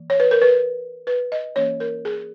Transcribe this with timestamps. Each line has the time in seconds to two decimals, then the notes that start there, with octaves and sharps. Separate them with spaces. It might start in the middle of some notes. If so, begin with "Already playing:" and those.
Already playing: E3 A#3
0.10 C#5
0.20 B4
0.31 A#4
0.42 B4
1.07 B4
1.32 D#5
1.56 E3 A#3 C#4 C#5
1.80 A#4
2.05 G#4